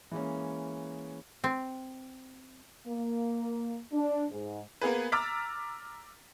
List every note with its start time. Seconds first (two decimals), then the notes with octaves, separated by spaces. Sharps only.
0.11 E3 G#3 A#3 C#4
1.44 C4
2.87 A#3
3.92 D4
4.31 G#2
4.82 A#3 B3 G#4 B4
5.12 A#5 D6 E6 F6 A6 B6